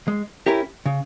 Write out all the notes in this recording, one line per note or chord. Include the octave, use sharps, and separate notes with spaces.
G#3
C#4 E4 G4 A#4
C#3